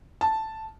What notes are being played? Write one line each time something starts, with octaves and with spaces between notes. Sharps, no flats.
A5